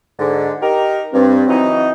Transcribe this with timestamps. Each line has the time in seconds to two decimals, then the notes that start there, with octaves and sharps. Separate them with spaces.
0.19 G#2 D3
0.61 D#4 G4 A#4
1.13 G2 C4
1.48 E3 F#3 D#4